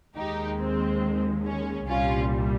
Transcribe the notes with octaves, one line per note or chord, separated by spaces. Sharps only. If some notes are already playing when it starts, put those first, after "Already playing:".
D#2 D#3 G#3 D#4 G4
C4
C#4
C2 A#2 G3 C#4 F4